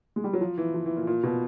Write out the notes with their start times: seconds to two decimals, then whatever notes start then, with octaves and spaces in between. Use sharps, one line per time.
0.16 G#3
0.24 G3
0.33 F#3
0.41 F3
0.58 E3
0.74 F3
0.86 E3
0.97 A#2
1.07 A#2
1.23 B2